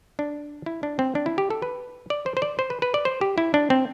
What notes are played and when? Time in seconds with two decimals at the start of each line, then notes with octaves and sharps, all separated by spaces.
0.19 D4
0.66 E4
0.83 D4
0.99 C4
1.15 D4
1.26 E4
1.38 G4
1.50 A4
1.62 B4
2.10 D5
2.26 C5
2.37 C5
2.42 D5
2.59 C5
2.70 B4
2.82 B4
2.94 D5
3.05 C5
3.21 G4
3.38 E4
3.54 D4
3.70 C4